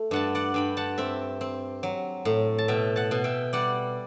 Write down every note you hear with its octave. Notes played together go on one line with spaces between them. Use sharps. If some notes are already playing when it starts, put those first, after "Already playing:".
Already playing: A3
G2 F#5 A5
D5 F#5
G2 G5 B5
F#5 A5
C4 E5 G5
C4
F#3
A2
A5
B2 E5 G5
F#5 A5
B2
E5 G5
G3 D5 F#5